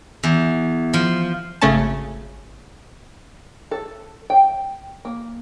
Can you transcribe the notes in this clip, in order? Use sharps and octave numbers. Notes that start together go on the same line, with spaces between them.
E2
F3
G#1 C#3 A3 C#4 A5
A4
G5
A#3